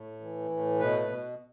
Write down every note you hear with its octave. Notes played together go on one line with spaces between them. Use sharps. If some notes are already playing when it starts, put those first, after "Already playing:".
Already playing: A2
E3
A2
B2 B4
B2